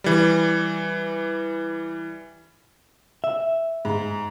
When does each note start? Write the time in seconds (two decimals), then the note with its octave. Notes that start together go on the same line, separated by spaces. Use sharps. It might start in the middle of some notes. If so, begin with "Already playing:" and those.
0.04 E3 G3
3.24 E5
3.85 G#2